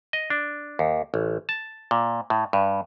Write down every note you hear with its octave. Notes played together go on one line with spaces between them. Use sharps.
D#5
D4
D#2
A1
A5
A#2
A2
G2